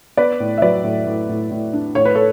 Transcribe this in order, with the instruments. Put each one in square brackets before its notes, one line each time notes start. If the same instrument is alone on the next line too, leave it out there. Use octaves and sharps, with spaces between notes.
[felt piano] B3 B4 D5
A2
E5
F#3 B4 D5
A2
A2
A2
A2
D4
A2 C#5
B4
A4 C#5